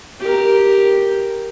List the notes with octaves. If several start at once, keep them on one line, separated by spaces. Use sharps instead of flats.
G4 A#4